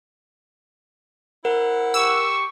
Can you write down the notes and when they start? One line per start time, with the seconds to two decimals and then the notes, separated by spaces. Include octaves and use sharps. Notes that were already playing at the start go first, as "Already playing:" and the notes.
1.45 E4 A#4 C5 F#5
1.94 G4 C#6 E6